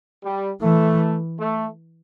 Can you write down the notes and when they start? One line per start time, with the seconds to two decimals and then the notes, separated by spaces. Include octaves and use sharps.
0.24 G3
0.61 E3 A3
1.38 A3